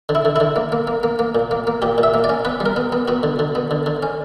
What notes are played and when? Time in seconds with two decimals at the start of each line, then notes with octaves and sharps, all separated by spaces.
0.09 D3
0.15 E4
0.25 D3
0.36 D3 E4
0.56 A#3
0.72 A#3
0.87 A#3
1.03 A#3
1.19 A#3
1.35 A#2
1.51 A#3
1.67 A#3
1.82 A#2 G4
1.98 A#2
2.03 E5
2.14 A#3
2.24 D5
2.29 C#4
2.45 B3 B4
2.60 G3
2.66 A#4
2.76 B3
2.92 B3
3.08 B3 F#4
3.23 D3
3.39 D3
3.55 B3
3.71 D3
3.86 D3
4.03 C#4